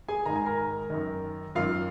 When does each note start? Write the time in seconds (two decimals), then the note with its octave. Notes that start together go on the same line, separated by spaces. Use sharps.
0.08 G#4 G#5
0.26 G#2 D#3 A#5
0.36 G#5
0.46 A#4 A#5
0.90 F#2 D#3
1.55 F#2 D#3 F4 F5